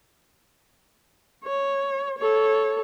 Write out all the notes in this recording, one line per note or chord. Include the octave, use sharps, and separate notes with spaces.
C#5
A4 C#5